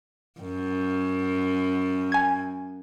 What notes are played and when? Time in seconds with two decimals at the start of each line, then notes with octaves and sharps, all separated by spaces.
0.41 F#2
2.12 G#5 G#6